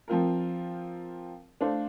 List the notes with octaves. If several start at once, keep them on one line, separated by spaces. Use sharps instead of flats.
F3 C4 F4 A#4
A3 D4 A4 C5 F5